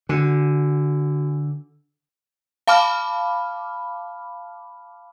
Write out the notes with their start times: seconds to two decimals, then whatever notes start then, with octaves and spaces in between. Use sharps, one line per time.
0.09 D3 F#4 G#5
2.67 F5 A5 B5 D6 F6